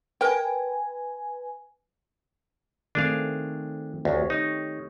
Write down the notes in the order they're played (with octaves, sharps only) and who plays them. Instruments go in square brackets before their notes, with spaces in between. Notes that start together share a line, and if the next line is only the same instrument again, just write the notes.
[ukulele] A#4 G5 [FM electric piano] B4 G#5
[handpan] D#3 A3 C4 [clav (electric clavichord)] D4 G#4 F5
[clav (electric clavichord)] D2 [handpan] G4 C#5
[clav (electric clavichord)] D#4